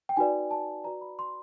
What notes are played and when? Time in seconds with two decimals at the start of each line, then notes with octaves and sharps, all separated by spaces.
0.09 G5
0.16 D#4 F#4 B4 D5 G#5
0.51 A5
0.84 F#4 B4 D5 A#5
1.01 B5
1.19 C6